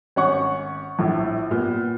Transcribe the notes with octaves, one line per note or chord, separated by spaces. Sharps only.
G#1 C#4 F#5 C#6
A#1 A2
A#2 B3